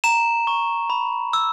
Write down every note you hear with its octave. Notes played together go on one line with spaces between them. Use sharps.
A#5 E7
C#6
B5
E6